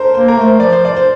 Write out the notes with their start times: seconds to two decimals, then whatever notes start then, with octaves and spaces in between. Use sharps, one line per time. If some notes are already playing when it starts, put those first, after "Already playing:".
Already playing: A4 A#4 C5
0.14 A#3 C5
0.28 A#4
0.37 A3 C5
0.59 F3 D5
0.73 C5
0.85 D5
0.96 C5